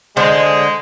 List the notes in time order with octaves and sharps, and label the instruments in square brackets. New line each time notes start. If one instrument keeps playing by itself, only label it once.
[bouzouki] D3 C5 [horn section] G#3